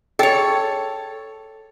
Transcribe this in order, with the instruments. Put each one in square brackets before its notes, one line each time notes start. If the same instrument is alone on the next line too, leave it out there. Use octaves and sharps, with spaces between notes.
[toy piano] G#4 D#5 G5 [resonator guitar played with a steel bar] A4 C#5